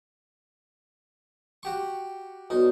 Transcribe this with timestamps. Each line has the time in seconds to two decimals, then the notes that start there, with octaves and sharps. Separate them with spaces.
1.63 F#4 G4 C#6
2.50 B1 D#4 F#4 D5